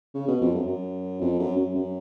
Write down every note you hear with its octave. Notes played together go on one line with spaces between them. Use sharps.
C#3
B2
F2
F#2
F#2
F2
F#2
F#2
F#2